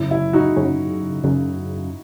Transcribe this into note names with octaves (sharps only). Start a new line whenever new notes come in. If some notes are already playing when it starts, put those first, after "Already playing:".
Already playing: F#2 C#3 F#3 E4
E4
D#4 F#4
F#2 C#3 F#3
F#2 C#3 F#3